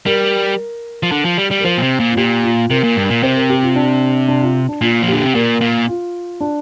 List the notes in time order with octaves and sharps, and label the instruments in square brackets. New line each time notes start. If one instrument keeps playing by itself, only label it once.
[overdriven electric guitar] G3 [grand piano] A#4
[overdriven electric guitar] F3
D3
F3
G3
G3
[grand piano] A#4
[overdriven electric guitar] F3 [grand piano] C5
[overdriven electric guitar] A#2
C3
A#2
[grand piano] F4
[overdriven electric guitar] A#2 [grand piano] G4
[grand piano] F4
[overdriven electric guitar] C3 [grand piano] A#4
[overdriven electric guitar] A#2
G2
A#2
[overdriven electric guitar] C3 [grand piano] C5
[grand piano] A#4
G4
F4
D4
D4
F4
D4
[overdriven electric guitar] A#2 [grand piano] F4
[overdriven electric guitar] F3
[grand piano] G4
[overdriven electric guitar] D3
C3
[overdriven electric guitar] A#2 [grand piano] A#4
[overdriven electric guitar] A#2
[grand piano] F4
D4